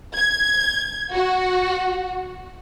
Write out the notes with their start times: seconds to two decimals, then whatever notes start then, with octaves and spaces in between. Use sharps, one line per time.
0.17 G#6
1.13 F#4